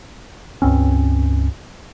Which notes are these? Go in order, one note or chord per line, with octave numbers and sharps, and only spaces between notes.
C#2 G2 C4 C#4